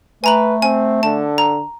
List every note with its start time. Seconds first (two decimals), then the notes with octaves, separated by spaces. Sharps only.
0.24 A3 B4 G#5 A#5 F#7
0.62 C4 G#5
1.03 D3 A5
1.38 A#5